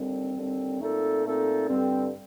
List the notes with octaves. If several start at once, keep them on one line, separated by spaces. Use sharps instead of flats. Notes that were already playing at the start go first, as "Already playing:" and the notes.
Already playing: D#2 D3 G3 C4
D#2 D3 G3 C4
A#2 A3 C4 D#4 A4
A#2 A3 C4 D#4 A4
G2 D3 G3 C4